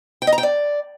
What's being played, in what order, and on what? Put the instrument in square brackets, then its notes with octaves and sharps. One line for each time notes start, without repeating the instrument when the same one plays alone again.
[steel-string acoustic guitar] G5
D#5
A#5
G5
D5